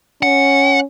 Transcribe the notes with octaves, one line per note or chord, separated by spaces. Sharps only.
C#4 F#5